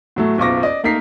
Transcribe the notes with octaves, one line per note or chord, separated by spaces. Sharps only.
A2 F#3 A3
F#1 B1 F4 C#6 D6 A#6
D5 D#5
A3 A#3 D#4 A#4 B6 C7